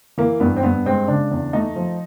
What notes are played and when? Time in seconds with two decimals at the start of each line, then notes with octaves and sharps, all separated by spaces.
0.18 E3 A#3
0.40 G2 B3
0.57 C4
0.63 G2 B3
0.85 G#3 C4
1.08 C#3 D4
1.31 E2
1.53 A3 D#4
1.76 F3